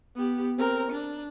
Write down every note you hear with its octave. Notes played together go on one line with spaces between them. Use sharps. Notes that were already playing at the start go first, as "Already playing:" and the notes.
B3 G4
C4 A#4
D4